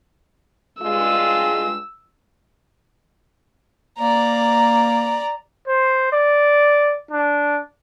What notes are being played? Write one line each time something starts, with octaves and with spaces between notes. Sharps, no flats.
G2 G#3 F4 E6
A#3 D5 A#5
C5
D5
D4